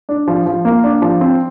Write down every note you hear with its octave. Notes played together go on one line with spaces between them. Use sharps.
D4
F3
F3
A#3
D4
F3
C4